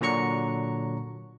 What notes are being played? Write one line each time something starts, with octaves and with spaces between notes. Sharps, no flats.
A#2 D3 F#3 A#5 C#6 C#7